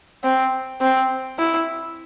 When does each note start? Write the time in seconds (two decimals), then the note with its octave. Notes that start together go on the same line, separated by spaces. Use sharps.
0.24 C4
0.81 C4
1.39 E4